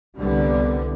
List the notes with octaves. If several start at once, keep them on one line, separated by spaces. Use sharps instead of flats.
C2 D3 G3 B3